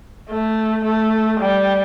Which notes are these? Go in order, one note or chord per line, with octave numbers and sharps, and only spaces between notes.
A3
A3
G3